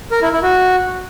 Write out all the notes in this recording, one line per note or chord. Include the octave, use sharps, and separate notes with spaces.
A#4
E4
E4
F#4